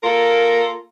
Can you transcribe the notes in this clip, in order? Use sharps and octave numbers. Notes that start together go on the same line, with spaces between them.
A#3 F4 A4 A#4